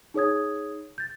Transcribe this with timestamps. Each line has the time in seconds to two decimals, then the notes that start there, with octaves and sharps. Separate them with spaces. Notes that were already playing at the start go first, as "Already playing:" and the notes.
0.14 D#4 G#4 C#5 D#6 G#6
0.98 G6 A6